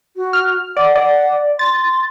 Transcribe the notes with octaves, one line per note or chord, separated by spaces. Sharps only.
F#4
F6
D5 F#5
D5
C6 A6